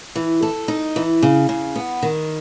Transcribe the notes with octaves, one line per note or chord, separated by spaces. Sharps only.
E3
A4
D#4
E3
C#3
C#3
B3
D#3